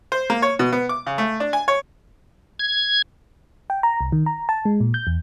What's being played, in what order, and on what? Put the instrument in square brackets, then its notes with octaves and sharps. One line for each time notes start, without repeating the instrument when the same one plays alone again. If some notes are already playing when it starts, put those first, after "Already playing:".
[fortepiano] C5
A#3
C#5
B2
B3
D6
C#3
A3
D4
G#5
C#5
[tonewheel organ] G#6
[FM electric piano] G5
A#5
C2
D#3
A#5
A5
G#3
A#2
G6
E2